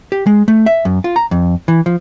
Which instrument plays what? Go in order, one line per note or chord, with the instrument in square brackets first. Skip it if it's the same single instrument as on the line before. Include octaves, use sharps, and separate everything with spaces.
[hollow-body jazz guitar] G4
G#3
A3
E5
F#2
F4
A#5
F2
E3
F3